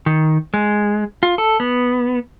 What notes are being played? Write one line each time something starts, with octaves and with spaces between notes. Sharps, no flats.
D#3
G#3
F4
A4
B3